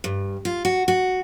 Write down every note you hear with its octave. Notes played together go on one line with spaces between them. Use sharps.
G2
F4
F#4
F#4